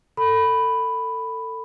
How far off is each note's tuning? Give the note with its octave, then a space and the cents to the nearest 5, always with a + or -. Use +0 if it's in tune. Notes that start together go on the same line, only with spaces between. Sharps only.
A4 +25 B5 +5